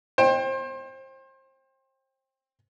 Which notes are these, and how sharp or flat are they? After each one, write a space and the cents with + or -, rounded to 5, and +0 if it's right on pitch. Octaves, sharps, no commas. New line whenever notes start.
C5 +30 G5 +15